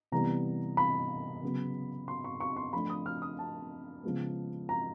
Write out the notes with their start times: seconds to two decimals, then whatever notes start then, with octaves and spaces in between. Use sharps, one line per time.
0.12 C3 E3 G3 B3 A#5
0.77 B5
1.43 C#3 F#3 B3
2.08 C6
2.24 C#6
2.40 C#6
2.57 C6
2.73 F3 A3 D4 B5
2.90 D#6
3.06 F6
3.22 D#6
3.39 A5
4.03 C#3 F3 G#3 B3
4.69 A#5